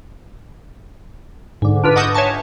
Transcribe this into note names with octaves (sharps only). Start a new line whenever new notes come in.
G#2 D3
D4 F4 B4
D#5 F#5 A5 C#6 D#6 G6
C#5 E5 G#5 A5 C#6